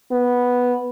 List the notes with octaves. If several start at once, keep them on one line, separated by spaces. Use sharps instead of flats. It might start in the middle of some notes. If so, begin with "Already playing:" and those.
B3